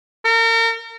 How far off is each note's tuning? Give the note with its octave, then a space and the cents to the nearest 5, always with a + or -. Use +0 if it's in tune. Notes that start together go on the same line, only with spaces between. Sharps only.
A#4 -35